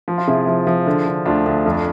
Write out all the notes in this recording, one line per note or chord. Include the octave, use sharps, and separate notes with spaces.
F3
F4
C3 E4 G#4
F3
F3
D3
D3
D2 D4 F4
D2
F2